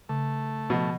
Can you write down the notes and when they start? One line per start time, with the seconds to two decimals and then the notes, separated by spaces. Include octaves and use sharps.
0.09 C#3 A3
0.70 B2 F3